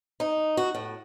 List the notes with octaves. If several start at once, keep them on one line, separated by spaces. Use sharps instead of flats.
D#4
F#4
A2